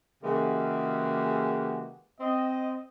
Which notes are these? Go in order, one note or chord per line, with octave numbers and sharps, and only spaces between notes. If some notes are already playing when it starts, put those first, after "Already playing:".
C#3 E3 G#3 A#3 F#4 G4
C4 D#5